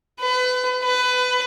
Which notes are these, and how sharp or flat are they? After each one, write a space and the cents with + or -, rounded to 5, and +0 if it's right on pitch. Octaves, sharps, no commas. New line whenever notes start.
B4 +30
B4 +20